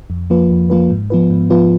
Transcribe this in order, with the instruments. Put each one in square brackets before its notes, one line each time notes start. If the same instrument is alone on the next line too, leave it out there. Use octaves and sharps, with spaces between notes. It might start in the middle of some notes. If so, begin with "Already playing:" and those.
[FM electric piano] F2
F3 A#3 F4 B4
F2
F3 A#3 F4 B4
G#2
F3 B3 F4 B4
G#2
F3 B3 F4 B4